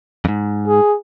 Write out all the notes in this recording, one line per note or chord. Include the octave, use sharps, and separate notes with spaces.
F2 G#2
G#4